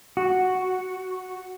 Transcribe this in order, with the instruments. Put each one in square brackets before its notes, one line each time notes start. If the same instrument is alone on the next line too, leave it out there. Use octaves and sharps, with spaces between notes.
[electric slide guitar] F#4